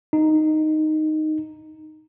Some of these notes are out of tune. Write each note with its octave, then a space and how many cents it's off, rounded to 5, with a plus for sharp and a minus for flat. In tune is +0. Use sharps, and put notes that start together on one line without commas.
D#4 -5